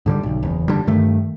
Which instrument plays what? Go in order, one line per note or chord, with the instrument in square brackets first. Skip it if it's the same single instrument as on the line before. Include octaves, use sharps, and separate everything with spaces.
[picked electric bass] G#2 D3 F3 G3
B1
F#1 E2
D3 G3
G2 D#3 A3